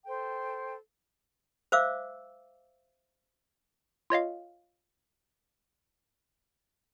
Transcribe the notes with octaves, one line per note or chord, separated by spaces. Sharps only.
A4 C5 G5
C5 E5 F5 D6 E6
F4 C#5 D#5 F5